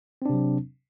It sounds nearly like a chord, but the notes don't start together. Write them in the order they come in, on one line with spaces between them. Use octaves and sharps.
C4 D4 C3 F#3